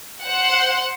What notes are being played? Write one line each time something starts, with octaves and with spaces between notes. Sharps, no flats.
C5 F#5